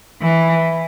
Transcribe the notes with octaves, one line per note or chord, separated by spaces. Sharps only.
E3